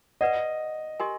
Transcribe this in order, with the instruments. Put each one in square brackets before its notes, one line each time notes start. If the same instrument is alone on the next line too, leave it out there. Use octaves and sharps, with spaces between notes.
[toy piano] B4 D5 F#5 [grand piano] D#5
[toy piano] G4 A#4 D#5 G#5 C6